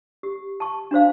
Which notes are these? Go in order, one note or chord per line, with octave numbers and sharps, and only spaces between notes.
G4
A5 C#6
D4 F#4 C5 F5